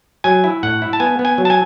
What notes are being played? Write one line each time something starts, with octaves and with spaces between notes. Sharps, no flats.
F#3 G#5
E4
A2 F#5
E4
A5
B3 G#5
B3
G#5
F#3
A5
G#5